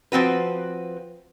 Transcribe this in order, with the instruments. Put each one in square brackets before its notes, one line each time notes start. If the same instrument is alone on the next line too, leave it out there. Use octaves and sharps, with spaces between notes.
[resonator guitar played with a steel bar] F3 C4 F#4 B4